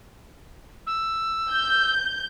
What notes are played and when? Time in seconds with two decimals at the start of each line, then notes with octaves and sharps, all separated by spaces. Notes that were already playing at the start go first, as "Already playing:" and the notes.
0.87 E6
1.52 G6